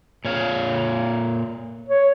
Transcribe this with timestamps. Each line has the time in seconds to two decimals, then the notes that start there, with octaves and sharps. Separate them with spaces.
0.25 A#2 C#5 F5
1.89 C#5